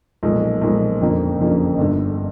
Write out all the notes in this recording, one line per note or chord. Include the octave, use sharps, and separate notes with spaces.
B1 A#2 F3 G#3
B1 A#2 F3 G#3
F#1 F2 D3 F3 A#3
F#1 F2 D3 F3 A#3
G1 G2 D3